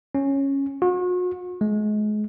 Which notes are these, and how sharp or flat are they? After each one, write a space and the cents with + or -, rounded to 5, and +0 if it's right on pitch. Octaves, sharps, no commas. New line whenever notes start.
C#4 -10
F#4 -40
G#3 +30